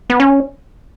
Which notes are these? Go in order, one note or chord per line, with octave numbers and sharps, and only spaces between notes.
B3
C#4